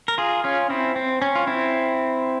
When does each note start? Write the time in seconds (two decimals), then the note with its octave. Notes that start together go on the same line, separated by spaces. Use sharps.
0.08 A#4
0.18 F4 G#4
0.44 C#4 F4
0.70 C4 E4
0.96 C4
1.22 C#4
1.35 F4
1.47 C4 E4